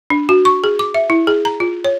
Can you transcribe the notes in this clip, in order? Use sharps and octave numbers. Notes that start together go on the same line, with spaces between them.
D4
F#4
C#6
G#4
D6
E5
E4
G#4
A#5
F4
C#5